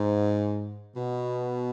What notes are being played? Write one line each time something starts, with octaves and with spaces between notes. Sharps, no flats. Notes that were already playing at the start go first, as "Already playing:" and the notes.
Already playing: G#2
B2